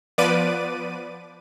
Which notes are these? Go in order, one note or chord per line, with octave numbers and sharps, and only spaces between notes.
F3 B3 B4 D5 D6 D#7